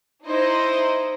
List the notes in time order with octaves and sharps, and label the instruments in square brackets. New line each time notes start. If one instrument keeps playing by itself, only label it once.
[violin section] D#4 E4 C5 D#5